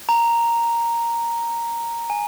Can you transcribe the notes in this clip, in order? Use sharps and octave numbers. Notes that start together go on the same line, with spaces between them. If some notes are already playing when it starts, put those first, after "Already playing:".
A#5
G#5